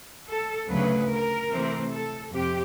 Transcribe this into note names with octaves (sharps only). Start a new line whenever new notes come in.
A4
D2 C#3 F#3 A3 B4
A#4
C3 E3 A3 C4
A4
F2 C3 G4